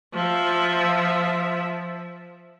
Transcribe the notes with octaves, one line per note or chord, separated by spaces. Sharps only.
F3 E5